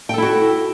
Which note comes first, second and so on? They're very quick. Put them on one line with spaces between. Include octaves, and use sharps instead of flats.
G5 A4 E4 F#4